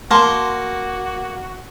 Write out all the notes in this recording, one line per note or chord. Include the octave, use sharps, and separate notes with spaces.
A#3 F#4 A5 C6 C#6